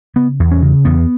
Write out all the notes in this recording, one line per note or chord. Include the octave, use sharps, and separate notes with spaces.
C#3 B3
E2
C#4
C#3
E2 B3